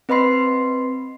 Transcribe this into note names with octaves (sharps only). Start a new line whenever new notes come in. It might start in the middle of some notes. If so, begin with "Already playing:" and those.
C4 B4 D#5 B5 C6 C7